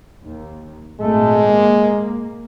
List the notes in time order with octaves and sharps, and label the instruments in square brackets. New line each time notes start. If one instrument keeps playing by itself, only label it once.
[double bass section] D#2
[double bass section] G#1 A#2 A3 [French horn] G#3
[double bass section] A#3